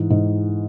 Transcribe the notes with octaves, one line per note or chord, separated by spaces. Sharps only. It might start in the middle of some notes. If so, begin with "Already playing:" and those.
Already playing: G#2 E3
G#2